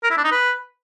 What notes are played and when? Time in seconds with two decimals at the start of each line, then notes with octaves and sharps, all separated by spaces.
0.03 A#4
0.10 E4
0.17 D4
0.24 D#4
0.31 B4